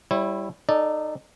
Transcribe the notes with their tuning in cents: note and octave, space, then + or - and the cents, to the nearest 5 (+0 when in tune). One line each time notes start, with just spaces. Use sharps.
G3 +0 E4 +5 C#5 -40
D#4 -20 A4 +0 D5 +0